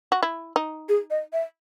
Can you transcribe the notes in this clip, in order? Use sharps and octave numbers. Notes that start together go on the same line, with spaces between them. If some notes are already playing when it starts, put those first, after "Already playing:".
F#4
E4
D#4
G#4
D#5
E5